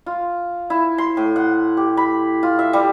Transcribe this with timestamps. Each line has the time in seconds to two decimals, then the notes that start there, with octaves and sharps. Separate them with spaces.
0.06 F4
0.70 E4
0.98 C6
1.17 A2
1.36 F#5
1.77 G4
1.97 B5
2.43 F4
2.59 E5
2.73 G3